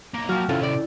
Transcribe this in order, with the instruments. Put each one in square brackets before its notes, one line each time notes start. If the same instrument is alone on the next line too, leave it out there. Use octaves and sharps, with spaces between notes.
[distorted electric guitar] B1 A#3
[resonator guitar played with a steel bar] F3 F#4 [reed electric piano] F#3 [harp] G5 F6
[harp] D#1 E4 A6 [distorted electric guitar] A2 C3 [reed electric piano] C#4 A4 [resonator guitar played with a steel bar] F4
[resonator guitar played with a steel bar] D5